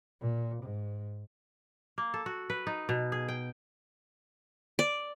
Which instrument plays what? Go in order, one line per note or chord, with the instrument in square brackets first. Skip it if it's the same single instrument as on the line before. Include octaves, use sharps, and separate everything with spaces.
[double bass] A#2
G#2
[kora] A#3
A4
F#4
B4
D#4
B2
G#4
G5
[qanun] D5